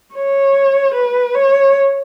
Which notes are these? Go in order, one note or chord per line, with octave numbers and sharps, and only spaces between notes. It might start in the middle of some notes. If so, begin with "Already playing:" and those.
C#5
B4
C#5